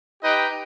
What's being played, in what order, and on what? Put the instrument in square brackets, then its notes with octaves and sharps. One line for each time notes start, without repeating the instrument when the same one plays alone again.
[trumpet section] D#4 G4 B4 D#5 G5